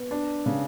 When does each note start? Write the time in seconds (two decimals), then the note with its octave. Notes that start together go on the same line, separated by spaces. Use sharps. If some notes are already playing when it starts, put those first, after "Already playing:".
Already playing: B3
0.11 D4
0.46 C#3